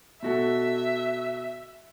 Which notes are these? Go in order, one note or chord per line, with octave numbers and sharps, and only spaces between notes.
B2 F#4 A4 E5